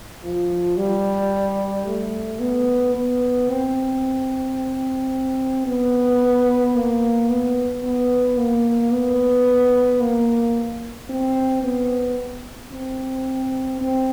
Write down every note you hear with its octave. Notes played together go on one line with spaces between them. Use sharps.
F3
G3
A3
B3
B3
C4
B3
A#3
B3
B3
A#3
B3
A#3
C4
B3
C4
C4